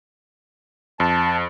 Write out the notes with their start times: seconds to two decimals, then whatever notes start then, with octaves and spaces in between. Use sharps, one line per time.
1.00 F2 A5